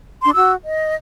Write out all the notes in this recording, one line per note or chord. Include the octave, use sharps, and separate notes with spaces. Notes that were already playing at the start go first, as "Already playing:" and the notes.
D4 C6
F#4 E6
D#5